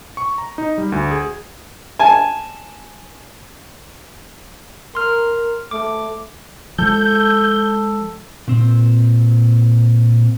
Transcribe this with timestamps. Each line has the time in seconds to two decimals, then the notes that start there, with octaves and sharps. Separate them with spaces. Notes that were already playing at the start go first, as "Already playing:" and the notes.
0.17 C#6
0.38 A#5
0.58 D#4
0.78 G3
0.92 D2
1.11 G#4
1.99 G#5 A5
4.95 A#4 C6 F6
5.71 A3 D6
6.78 F3 G#3 A4 G6
8.48 A#2 C4